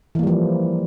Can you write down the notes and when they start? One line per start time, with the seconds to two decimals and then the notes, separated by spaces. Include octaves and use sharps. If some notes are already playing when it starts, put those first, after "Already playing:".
0.15 E3
0.19 A#3
0.23 G3
0.27 F3